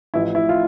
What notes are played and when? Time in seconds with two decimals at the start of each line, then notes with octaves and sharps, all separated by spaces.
0.14 A1 A2 F3 E4
0.35 E4
0.49 F4